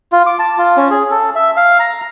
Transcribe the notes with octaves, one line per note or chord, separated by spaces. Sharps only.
F4
D6
A5
F4
C#4
G#4
A4
E5
F5
A#5